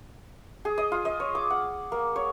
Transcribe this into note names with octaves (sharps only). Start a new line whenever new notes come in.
G#4
D#5
F4
D#5
C#5
D6
F#5
A#3
C#5